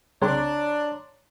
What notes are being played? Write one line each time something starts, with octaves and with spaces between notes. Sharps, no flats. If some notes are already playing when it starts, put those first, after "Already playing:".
C2 C#3 C4 D4 C#5 A#5 C6